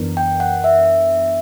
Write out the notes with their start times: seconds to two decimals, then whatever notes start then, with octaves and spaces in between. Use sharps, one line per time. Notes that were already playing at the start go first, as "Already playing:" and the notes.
Already playing: F#2 E3 B3 D4 A#4
0.17 G5
0.40 F#5
0.64 E5